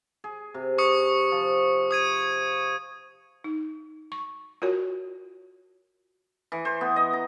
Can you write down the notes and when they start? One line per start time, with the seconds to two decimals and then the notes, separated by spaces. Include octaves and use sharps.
0.24 G#4
0.54 C3
0.78 C#6 D#6 C#7
1.31 F3
1.91 D#6 G#6 D#7
3.44 D#4
4.12 C#6
4.62 F4 F#4 A#4 C#5
6.52 E3
6.65 C5
6.81 B3
6.96 D#5
7.13 A#5